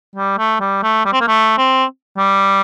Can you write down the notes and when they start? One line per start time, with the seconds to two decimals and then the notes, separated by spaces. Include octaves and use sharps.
0.15 G3
0.38 A3
0.60 G3
0.83 A3
1.06 G3
1.13 C4
1.21 A#3
1.28 A3
1.58 C4
2.17 G3